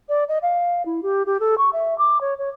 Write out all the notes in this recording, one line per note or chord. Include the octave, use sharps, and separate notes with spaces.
D5
D#5
F5
E4
G4
G4
A4
C#6
E5
D6
C#5
C#5